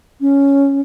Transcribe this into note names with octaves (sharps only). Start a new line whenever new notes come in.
C#4